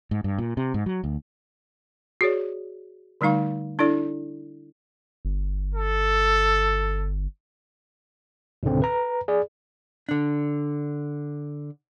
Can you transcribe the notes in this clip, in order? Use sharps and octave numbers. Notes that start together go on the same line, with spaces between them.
G#2
G2
A#2
C3
G#2
F#3
D2
F#4 G#4 C#5 D5
D3 G3 A3 D#4 F5 C#6
D4 E4 A4 D5
G1
A4
C#2 G#2 B2 D3 C4
B4 A#5
G#4 D5
D3 D4